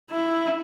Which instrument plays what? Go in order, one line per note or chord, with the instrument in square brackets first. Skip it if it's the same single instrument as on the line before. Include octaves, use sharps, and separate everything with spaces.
[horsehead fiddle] E4